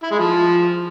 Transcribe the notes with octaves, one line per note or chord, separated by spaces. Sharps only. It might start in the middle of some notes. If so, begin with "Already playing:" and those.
E4
G#3
F3